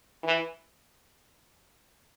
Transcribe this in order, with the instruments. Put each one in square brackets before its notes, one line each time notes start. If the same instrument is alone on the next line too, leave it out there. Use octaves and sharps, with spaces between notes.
[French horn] E3